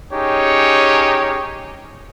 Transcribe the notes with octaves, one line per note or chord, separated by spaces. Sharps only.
C#4 D#4 G4 G#4 C#5